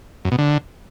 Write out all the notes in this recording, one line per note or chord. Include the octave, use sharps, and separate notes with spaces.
F#2
B2
D3